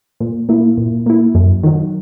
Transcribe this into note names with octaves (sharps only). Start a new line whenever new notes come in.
A#2
A#3 E4
A#2
A#3 E4
F#2
D#3 F#3